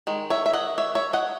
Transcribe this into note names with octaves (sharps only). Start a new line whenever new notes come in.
D#3 G#3
C#5 E5
E5
D#5 F#5
C#5 E5
C#5 E5
D#5 F#5